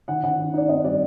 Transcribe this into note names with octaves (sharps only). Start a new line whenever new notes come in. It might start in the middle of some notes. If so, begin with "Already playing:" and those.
D#3 F#5
D#3 F#5
D#4
D#4 D5
C4 D#5
G3 D5